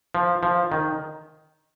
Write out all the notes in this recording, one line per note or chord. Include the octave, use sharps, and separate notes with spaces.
F3
F3
D#3